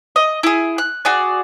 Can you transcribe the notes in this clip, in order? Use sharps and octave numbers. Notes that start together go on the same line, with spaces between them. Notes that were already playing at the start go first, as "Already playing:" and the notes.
D#5
E4 G#4
F#6
F#4 G#4 D5